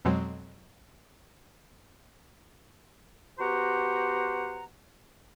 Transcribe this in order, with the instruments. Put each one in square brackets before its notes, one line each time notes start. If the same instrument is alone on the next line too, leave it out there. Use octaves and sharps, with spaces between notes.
[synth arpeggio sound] F2 B2 F#3 G#3 C4
[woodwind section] B3 F#4 G4 C5 F#5 A#5